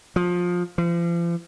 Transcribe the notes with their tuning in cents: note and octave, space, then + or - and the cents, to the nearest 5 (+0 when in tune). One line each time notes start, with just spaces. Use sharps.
F3 +20
F3 -40